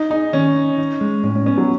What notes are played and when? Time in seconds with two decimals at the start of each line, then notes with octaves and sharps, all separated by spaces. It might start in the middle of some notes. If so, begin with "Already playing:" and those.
Already playing: D#4
0.10 D#4 G#4
0.33 D#3 C#4
0.56 D#4
0.78 D#4
1.01 G#3
1.23 A2 C#4
1.35 C#4
1.46 B3 C#4
1.58 F#3